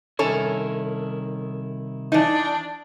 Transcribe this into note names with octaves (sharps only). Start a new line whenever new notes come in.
C2 D#3 C#4 E4 A4 C#5
E3 D4 D#4